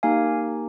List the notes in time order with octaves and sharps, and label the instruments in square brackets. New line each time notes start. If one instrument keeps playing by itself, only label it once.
[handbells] A#3 D#4 G4 F5 G#5